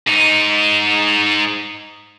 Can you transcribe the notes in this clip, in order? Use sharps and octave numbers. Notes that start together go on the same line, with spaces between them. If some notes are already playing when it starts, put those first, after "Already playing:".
G#2 D#4